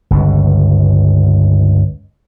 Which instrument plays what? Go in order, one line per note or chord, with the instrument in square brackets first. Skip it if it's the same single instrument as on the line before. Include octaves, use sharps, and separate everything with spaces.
[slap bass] G1 C#2